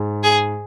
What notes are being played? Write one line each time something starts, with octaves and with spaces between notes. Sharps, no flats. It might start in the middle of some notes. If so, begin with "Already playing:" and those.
Already playing: G#2
G#4